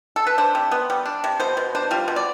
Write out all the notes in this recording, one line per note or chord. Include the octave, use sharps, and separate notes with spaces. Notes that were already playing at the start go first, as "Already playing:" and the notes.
A4
B4
D4 C5
C3
B3
G3
D4
C3
B2 C5
B2
D4 C5
G3 F4
B2
D5